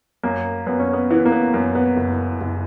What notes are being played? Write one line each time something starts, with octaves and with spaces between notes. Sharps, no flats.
F#2 A#3
F#2 B3
C#4
B3
E3 B3
A#3
B3
F#2 A#3
B3
F#1
F#1